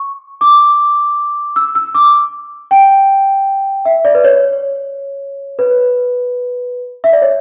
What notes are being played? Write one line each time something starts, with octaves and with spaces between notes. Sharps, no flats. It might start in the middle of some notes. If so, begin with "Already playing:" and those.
Already playing: C#6
D6
E6
E6
D6
G5
E5
D5
B4
C#5
B4
E5
D5
C#5